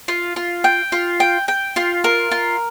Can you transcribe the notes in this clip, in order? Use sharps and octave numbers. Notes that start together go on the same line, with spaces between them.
F4
F4
G5
F4
G5
G5
F4
A#4
F4